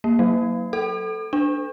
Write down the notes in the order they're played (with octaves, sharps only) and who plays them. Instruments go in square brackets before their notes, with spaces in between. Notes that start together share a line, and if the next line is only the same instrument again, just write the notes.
[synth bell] A#3
F#3
A4
D4